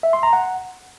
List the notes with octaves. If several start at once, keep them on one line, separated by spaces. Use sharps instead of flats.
E5
C6
A#5
F#5